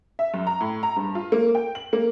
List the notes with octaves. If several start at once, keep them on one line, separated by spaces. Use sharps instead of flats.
E5
F#2
A#5
A2
A#5
G2
F4
A#3
G5
F#7
A#3